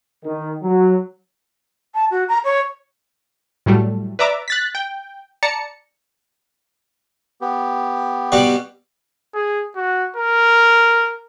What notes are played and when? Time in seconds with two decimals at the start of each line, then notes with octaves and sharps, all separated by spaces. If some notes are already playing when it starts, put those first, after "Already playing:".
0.25 D#3
0.63 F#3
1.94 A5
2.10 F#4
2.28 A#5
2.44 C#5
3.66 A2 F#3 G3 A3
4.19 B4 D5 E5 A#5 D6
4.48 F#6 A6 B6
4.75 G5
5.43 D5 A5 A#5 C#7
7.41 B3 G4
8.32 B2 G3 F#4
9.34 G#4
9.76 F#4
10.17 A#4